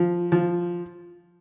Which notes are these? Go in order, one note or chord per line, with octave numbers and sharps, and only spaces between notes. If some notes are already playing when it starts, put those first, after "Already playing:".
Already playing: F3
F3